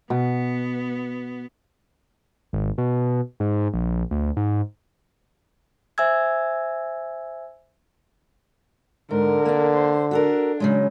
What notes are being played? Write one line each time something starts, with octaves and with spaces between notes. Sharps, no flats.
B2 B3
G#1
B2
G#2
A#1
D2
G#2
C5 E5 G#5 E6 G#6
G#2 D3 A#4
A#3 D4
C5
D4 F#4 A4 A#4
C#3 F#3 G#3